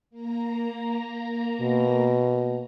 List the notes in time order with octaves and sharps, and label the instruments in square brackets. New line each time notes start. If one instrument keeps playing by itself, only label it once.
[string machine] A#3 A#5
[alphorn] B2